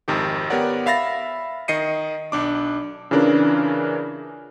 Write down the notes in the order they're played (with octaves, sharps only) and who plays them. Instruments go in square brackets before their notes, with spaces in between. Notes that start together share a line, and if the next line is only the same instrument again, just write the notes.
[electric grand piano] G#1 F2 D#3 G4
B3 G4 A#4 C#5 D5 F#5
E5 F5 B5 A6 A#6
D#3 D#5 C7 C#7 D#7
B1 D4 D6
C#3 E3 C#4 D4 F4 A#4